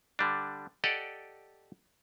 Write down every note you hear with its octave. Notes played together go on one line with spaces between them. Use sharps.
D3 G3 D4
G4 A4 D5 D#5 F#5